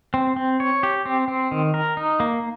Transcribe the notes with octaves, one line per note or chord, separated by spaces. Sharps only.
C4
C4
C#5
G4
C4
C4
D#3
A#4
D#4
A#3